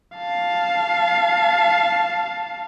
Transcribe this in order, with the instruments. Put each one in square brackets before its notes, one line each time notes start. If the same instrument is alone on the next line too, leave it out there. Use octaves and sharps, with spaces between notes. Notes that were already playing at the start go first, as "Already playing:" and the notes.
[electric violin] F5 A5